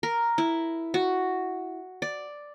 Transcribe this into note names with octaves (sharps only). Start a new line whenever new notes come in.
A#4
E4
F#4
D5